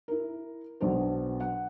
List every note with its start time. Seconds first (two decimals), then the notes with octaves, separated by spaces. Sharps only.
0.08 E4 A#4
0.81 B1 B2 B3 D4 F#4 C5
1.41 F#5